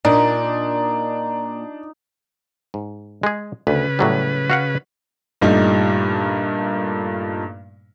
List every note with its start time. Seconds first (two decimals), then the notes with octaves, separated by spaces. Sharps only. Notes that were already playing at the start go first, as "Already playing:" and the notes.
0.05 A#2 D4 D#4
2.74 G#2
3.23 G#3 G#4
3.67 D2 C#3 B4
3.99 A2 F#3 G3
4.50 F#4 F5 F#5
5.41 G2 A#2 G3 A3 A#3 D#4